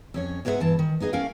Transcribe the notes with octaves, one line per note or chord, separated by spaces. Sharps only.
F2 C#4 C#5
G#2 B3 G#4 A#4 E5 F#5
G2 E3 A5
D#3
B3 D#4 G#4 D#5
A3 C#4 A#4 D5 F5 G5